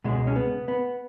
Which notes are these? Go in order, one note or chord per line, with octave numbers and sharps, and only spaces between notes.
C#2 B2 G#3
C#4
B3
B3